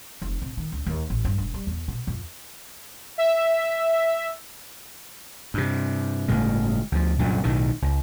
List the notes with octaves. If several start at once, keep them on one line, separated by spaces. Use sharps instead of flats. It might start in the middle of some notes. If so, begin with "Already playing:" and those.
F1
C3
D#3
C#2
D#2
A1
G2
E1
G3
E2
B2
F2
E5
G2 C3
G1 A2 C#3 G#3
D2 F3
C2 F#2 A#2 D3
B1 A2 D#3
C#2